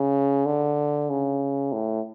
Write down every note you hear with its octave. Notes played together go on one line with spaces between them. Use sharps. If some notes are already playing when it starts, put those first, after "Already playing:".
Already playing: C#3
D3
C#3
A2